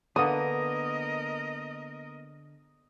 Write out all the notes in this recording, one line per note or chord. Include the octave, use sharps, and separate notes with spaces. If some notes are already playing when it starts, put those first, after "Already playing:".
D3 A#3 B3 A#4 D#5 D#6